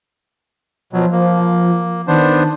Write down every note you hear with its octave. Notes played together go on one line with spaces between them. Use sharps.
B2 F3 F#3
F3 A#3
D#3 B3 D4 C5